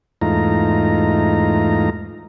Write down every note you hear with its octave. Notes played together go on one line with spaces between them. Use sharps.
E2 G#2 A3 D#4 F4 A#5